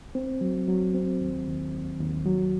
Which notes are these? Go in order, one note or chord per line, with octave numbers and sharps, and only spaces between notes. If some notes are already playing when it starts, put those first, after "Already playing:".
C4
F#3
F#3
C4
D#2
D#2
D#2
D#2
F#3